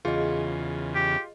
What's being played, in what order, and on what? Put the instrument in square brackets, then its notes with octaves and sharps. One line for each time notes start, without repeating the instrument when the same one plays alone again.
[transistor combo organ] E2 C#3 [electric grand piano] F4 [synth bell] G#4 D#5
[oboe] G4